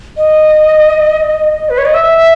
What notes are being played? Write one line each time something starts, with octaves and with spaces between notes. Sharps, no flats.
D#5
B4
C#5
D#5
E5